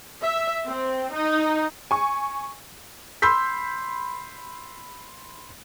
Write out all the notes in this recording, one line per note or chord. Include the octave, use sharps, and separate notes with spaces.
E5
C4
D#4
G#5 C#6
B5 C6 E6 G6 B6